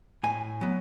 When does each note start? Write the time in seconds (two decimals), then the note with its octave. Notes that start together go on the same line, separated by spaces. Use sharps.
0.23 A2 G#5
0.61 F#3 B3